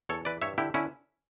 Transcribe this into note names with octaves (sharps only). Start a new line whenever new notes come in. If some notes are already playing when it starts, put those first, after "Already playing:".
E2 A4 C#5
E3 B4 D5
G2 C#5 E5
D3 E4 G4
D3 C#4 E4